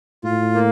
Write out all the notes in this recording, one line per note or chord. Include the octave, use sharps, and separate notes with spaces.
A2 F4
A#3